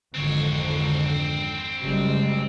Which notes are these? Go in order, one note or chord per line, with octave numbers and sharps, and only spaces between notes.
G#1 F2 D3 C4 C#5
F#1 G3 G#3